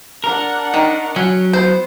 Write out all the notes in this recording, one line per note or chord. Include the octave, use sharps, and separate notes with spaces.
D4 A#4 F#5
D#3
F#3 C#4
B3 C5